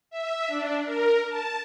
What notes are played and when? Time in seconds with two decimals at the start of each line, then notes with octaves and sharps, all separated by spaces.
0.10 E5
0.48 D4
0.84 A#4
1.28 A5